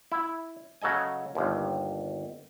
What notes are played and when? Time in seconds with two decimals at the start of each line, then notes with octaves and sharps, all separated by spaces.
0.12 E4
0.82 C#3 F#3 A4 D#5 G#5
1.35 G1 D#2